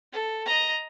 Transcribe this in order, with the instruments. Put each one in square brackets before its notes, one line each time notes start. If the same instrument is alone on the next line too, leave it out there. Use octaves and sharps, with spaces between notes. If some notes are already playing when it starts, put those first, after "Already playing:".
[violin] A4
D#5 A#5